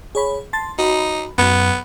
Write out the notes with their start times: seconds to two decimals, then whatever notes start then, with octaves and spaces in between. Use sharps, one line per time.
0.15 G#4 C#5 B5
0.53 A5 C6 A6
0.79 D#4 F#4 B5
1.38 F#2 F#3 B3